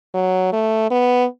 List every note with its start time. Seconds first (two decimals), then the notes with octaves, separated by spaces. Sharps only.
0.15 F#3
0.53 A3
0.91 B3